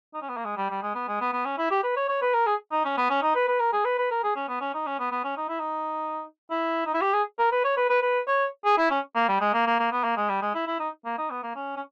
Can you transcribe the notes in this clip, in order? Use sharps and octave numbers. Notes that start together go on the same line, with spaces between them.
D#4
C#4
B3
A#3
G#3
G3
G3
G#3
B3
G#3
B3
B3
C#4
E4
G4
B4
C#5
C#5
B4
A#4
G#4
D#4
C#4
B3
C#4
D#4
B4
B4
A#4
G#4
B4
B4
A#4
G#4
C#4
B3
C#4
D#4
C#4
B3
B3
C#4
D#4
E4
D#4
E4
D#4
E4
G4
G#4
A#4
B4
C#5
B4
B4
B4
C#5
G#4
E4
C#4
A#3
G3
G#3
A#3
A#3
A#3
B3
A#3
G#3
G3
G#3
E4
E4
D#4
A#3
D#4
B3
A#3
C#4
C#4